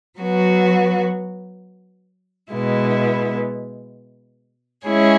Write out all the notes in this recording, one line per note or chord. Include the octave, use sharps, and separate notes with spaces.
F#3 B3 F#4
B2 G#3 B3 E4
G#3 C#4 E4 G#4 C#5